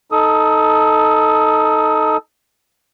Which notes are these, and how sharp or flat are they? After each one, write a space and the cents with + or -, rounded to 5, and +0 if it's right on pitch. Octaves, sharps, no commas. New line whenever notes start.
D#4 +0 A4 +0 D#6 +25